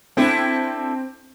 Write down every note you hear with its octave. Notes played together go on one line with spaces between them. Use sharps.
C4 D4 E4 A4